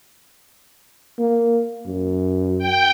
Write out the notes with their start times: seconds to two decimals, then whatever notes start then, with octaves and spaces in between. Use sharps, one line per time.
1.19 A#3
1.86 F#2
2.59 G5